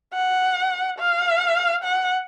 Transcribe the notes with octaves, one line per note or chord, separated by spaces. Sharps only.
F#5
F5
F#5